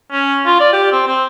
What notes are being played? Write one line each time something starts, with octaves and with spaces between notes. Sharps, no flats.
C#4
F4
D5
G4
C4
C4